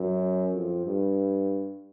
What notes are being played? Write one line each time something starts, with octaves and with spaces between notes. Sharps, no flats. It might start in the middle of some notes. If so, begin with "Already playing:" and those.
Already playing: F#2
F2
G2